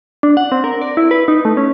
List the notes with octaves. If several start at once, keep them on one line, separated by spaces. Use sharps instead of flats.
D4
F#5
C4
A#4
D5
E4
B4
D#4
A3
C#4